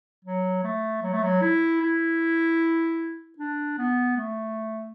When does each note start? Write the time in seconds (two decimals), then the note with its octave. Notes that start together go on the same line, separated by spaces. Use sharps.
0.25 F#3
0.64 A3
1.03 F#3
1.13 A3
1.23 F#3
1.42 E4
1.82 E4
3.38 D4
3.78 B3
4.17 A3